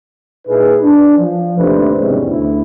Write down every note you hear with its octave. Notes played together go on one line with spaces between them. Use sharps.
A#2 D#4 E4 G#4 B4
D4
F3
D#2 C3 A3 D4 B4 C5
E2 G#2 C3 E3 G3 C#4
D2 E4